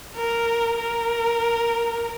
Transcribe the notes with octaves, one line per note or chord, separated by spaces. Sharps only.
A#4
A#4